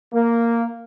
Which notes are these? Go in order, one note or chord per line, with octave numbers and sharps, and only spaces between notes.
A#3